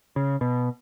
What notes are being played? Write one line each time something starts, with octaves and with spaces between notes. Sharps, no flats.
C#3
B2